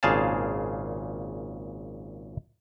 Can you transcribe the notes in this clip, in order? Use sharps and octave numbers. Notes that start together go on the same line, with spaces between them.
G#1 A#2 C#3 G#4 F5 A5